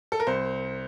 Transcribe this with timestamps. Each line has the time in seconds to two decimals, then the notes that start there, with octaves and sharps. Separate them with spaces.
0.12 A4
0.20 A#4
0.27 C2 C5